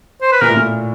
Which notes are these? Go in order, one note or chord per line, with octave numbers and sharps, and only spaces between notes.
C5
B4
A#2 A#4
A2
A#2